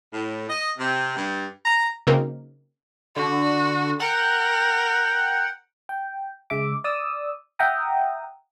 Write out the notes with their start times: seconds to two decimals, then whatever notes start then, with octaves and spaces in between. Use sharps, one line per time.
0.13 A2
0.48 D#5
0.77 C3
1.15 G2
1.64 A#5
2.07 C#3 F#3 A#3 C4 D#4 A#4
3.16 D3 F#4
4.00 A#4 F#5 G5
5.89 G5
6.50 C#3 G#3 E5 D6
6.84 D5 D#6 E6
7.59 E5 F#5 G5 A#5 D#6